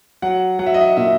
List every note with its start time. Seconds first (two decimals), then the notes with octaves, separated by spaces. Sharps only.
0.22 F#3 F#5
0.59 F#3 F#5
0.66 E5
0.74 D#5
0.81 E5
0.97 A#2 E5